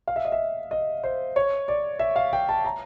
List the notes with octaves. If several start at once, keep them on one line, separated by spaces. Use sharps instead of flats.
F5
E5
D#5
E5
D#5
C5
C#5
D5
E5
F5
G5
A5
A#5